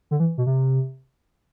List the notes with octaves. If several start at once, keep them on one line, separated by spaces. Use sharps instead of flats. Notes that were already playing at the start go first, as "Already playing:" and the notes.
D3
E3
B2
C3